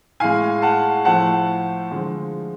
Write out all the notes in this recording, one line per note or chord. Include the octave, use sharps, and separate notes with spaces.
A2 G#3 F5 G#5
F#5 A5
A2 F3 A3 F#5 A5
D3 F3 G#3